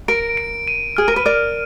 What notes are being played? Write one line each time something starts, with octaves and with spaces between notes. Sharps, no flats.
A#4 D7
D7
D#7
G#4 F6
A#4
B4
A#4 D5 F6